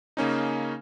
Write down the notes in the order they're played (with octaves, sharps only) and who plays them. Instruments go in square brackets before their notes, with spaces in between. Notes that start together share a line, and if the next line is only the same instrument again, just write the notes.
[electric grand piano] C#3 A#3 C#4 D#4